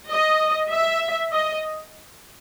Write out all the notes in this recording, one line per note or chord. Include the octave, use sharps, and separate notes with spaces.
D#5
E5
D#5